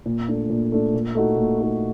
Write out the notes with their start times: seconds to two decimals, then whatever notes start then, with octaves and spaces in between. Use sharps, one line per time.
0.06 A#2
0.28 A3 D4
0.50 A#2
0.72 A3 D4
0.94 A#2
1.15 A3 D#4 F#4
1.37 A#2
1.58 A3 D#4 F#4